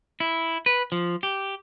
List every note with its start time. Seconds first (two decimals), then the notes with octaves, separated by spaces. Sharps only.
0.20 E4
0.66 B4
0.92 F3
1.23 G4